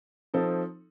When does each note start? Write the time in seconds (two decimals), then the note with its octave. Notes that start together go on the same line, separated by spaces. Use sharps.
0.34 F3 C4 D#4 A4